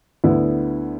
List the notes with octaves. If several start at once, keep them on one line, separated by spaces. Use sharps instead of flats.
D2 D3 B3 E4